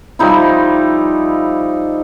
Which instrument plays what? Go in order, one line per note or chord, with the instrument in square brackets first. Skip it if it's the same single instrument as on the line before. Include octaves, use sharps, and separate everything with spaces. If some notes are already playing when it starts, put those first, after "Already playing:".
[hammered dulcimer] F3 G3 D#4 E4